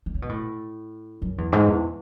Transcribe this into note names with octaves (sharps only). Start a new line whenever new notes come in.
D3
C#3
B2
A2
F#2
E2
G#2
E2